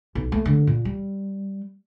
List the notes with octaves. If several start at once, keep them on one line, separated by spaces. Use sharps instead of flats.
B1
A3
D3
A#2
G3